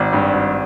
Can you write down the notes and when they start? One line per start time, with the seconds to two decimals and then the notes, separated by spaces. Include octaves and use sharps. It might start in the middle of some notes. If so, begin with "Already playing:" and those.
Already playing: G#1 D5
0.13 G2
0.33 G#1